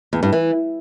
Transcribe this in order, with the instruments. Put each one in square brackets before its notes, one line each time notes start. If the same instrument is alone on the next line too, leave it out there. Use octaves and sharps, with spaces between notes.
[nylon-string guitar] E2
G2
E3